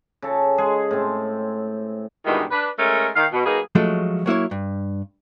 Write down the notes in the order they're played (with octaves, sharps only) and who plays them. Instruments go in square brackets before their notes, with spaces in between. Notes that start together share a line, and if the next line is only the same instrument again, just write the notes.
[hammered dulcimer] C#3 A4
G#3 G#4
A2 C4
[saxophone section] G2 B2 D#3 E3 G#3
D4 B4
G#3 A3 C#4 A#4
D#3 F5
B2
F#3 A#3 D#4 G#4 B4
[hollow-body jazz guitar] F3 F#3 G#3 A3 C#4
F#3 A#3 E4 C#5
G2